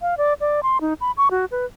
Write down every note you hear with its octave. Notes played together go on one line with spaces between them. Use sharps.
F5
D5
D5
C6
D#4
B5
C#6
F#4
B4